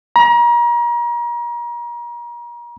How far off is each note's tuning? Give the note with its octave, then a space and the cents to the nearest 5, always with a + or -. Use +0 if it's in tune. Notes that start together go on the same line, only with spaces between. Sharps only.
A#5 +35